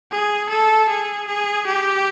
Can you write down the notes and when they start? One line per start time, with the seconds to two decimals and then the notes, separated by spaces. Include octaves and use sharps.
0.11 G#4
0.49 A4
0.89 G#4
1.27 G#4
1.66 G4